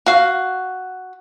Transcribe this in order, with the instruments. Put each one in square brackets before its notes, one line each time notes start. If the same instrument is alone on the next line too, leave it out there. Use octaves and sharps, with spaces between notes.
[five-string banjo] F#4 F5